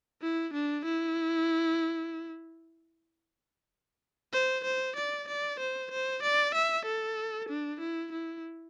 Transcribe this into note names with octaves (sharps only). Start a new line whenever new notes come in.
E4
D4
E4
C5
C5
D5
D5
C5
C5
D5
E5
A4
D4
E4
E4